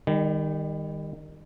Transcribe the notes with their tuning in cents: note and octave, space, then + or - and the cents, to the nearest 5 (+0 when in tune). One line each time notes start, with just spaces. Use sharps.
D#3 -15 G3 +30